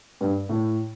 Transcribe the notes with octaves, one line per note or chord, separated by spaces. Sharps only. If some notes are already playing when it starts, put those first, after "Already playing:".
G2
A2